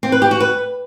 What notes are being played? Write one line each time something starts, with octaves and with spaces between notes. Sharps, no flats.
C4
B4
G4
F#4
B4